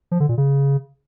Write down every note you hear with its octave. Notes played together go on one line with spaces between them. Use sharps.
F3
D3
A#2
C#3